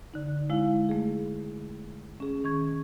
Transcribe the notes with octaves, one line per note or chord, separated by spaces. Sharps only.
D3 D#4
G#3 E4 F5
A3 G#4
C#4 G#4
D#3 C#6 G#6